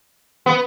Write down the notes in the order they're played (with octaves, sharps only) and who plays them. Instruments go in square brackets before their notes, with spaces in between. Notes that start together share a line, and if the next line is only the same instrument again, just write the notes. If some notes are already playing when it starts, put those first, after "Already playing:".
[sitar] B3